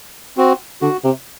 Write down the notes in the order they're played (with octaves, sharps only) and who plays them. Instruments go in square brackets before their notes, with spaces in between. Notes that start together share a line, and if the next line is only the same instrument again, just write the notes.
[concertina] C4 F#4
[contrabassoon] D3 [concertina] F#4
[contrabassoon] C3